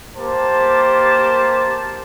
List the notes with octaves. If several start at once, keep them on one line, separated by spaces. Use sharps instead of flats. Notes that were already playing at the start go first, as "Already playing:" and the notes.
A#3 G4 C5 A5